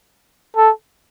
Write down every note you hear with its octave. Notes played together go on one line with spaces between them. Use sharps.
A4